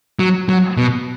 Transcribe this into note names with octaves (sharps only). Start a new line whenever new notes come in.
F#3
F#3
B2